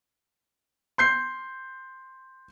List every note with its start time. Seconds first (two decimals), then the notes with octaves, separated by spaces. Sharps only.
0.98 C6 G6 C7